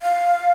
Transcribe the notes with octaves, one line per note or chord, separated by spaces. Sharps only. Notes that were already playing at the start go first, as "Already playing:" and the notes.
F5